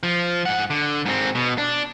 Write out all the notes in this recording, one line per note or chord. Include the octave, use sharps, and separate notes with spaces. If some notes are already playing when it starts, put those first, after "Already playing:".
F3
G#2 F#5
D3
G#2 C4
B2
D4